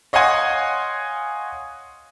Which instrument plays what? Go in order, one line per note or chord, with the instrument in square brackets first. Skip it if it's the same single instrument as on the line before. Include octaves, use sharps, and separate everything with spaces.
[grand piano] C#5 D#5 F5 F#5 G#5 C6